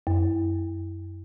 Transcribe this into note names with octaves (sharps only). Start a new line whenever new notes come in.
F#2